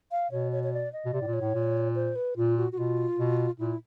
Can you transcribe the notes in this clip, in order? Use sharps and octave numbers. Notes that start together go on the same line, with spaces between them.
F5
B2 C#5
C#5
C#5
D5
D#5
B2
C3 D5
A2
A#2
C#5
A2
A#2
C5
B4
A#2 F4
F#4
F#4
B2 F4
B2
A#2 E4